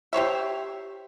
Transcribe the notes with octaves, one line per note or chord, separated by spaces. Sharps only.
G4 C5 C#5 E5